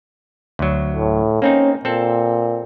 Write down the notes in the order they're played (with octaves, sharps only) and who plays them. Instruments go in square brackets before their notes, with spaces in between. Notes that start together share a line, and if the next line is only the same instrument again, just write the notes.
[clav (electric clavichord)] D2 F#3
[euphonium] A2
[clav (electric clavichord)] A#3 C4 D#4 [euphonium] C#4
[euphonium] A#2 [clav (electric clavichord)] C4 A4